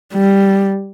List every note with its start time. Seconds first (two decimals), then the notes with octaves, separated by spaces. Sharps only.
0.14 G3